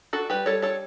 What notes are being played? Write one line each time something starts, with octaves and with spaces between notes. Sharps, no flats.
D4 F#4 A4
G3 G4 B4
G3 A4 C#5
D4 A4 C#5